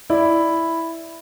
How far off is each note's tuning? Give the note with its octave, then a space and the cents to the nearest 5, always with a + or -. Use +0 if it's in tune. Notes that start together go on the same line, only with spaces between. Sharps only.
E4 +0 D5 +0